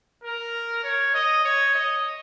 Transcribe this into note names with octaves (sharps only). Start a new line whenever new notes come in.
A#4
C#5
D#5
C#5
D#5